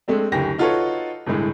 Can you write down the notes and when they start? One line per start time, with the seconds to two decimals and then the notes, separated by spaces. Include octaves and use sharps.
0.08 G#3 A3 C4 D4
0.32 F#1 D2 G4 A#6
0.58 D#4 F4 F#4 A4 B4 C#5
1.26 G1 C2 A2 G#3